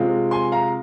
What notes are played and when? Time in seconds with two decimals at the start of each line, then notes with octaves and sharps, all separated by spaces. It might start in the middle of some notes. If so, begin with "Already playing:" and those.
Already playing: C3 G#3 C4 F4
0.31 G#5 C6
0.52 F5 A#5